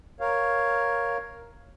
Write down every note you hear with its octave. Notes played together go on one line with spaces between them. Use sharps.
A#4 C#5 F5